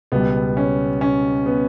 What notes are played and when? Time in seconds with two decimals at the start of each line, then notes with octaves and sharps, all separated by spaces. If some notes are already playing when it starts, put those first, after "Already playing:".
0.12 C#2 B2 G3 B3
0.57 C#4
1.01 C#4
1.46 B3